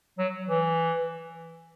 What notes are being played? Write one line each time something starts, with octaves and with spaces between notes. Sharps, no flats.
F#3
E3